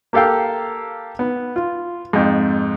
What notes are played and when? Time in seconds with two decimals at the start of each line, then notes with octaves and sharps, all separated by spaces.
0.13 A#3 G4 A4 F5 G5
1.19 B3
1.56 F4
2.13 F2 G#2